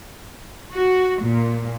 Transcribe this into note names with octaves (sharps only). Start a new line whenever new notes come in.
F#4
A#2